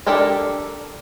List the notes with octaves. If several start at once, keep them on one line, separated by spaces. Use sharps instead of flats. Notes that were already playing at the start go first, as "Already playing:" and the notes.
D4 G4 A4 A#4 D5